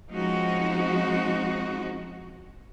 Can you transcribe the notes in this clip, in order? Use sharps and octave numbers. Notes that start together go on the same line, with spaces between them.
F3 G#3 C4 C#4 D#4 F#4